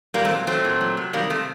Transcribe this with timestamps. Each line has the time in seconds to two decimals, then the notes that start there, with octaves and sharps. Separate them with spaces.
0.14 A#2 G3 A#3
0.25 A3 C4
0.31 F#3
0.47 F#3 A3 C4
0.64 A#2
0.81 F#3
0.97 C3
1.13 D#3 G3 A#3
1.30 C3 A3